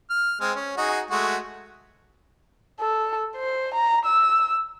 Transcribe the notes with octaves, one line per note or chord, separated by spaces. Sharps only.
F6
G#3 C4 F6
C#4
D#4 F#4 G#4
G#3 A3 F#4
A4
C5
A#5
E6